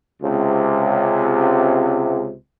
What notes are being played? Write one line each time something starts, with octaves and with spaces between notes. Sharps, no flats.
C#2 C3